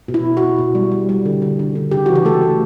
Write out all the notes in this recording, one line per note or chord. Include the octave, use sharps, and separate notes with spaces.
B2
E4
B2
F#4
B2
B2
G3
G3
G3
D3
D3
D3
D3
C#3 G4
E3 F#4
G4
A3 A4
A3